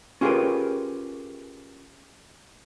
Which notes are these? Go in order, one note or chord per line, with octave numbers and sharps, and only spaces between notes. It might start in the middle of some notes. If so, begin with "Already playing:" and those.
C#4 F4 G4 G#4 A#4 B4